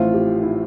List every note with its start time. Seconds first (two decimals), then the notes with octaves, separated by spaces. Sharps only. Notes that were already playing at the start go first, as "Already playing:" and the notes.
Already playing: A1 A2 F3 C4 F4
0.14 G4
0.43 E4